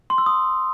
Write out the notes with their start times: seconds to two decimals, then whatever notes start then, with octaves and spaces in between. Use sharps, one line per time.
0.10 C6
0.18 E6
0.26 D#6